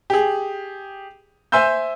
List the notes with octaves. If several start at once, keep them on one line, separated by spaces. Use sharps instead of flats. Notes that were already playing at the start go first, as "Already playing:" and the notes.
G4 G#4
C5 E5 G#5 C6 E6 G6